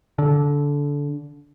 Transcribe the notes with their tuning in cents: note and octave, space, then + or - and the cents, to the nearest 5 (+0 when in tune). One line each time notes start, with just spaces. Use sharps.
D3 -20